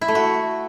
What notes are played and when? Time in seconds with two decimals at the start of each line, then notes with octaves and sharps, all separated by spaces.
0.01 E4
0.08 A3
0.15 F#4